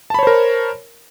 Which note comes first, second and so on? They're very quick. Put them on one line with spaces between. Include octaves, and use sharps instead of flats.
A5 B5 C#5 C5 A#4